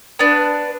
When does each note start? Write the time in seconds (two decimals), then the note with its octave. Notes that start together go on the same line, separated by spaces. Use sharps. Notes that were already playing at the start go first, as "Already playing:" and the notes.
0.19 B3 D4 B4